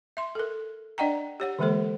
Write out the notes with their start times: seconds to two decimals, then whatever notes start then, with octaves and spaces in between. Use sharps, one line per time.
0.17 E5 C6
0.35 A4 A#4
0.98 D4 D5 D#5 F#5 G5 A#5
1.40 G4 C#5 F#5
1.59 D3 E3 G#3 A#3 A4 C5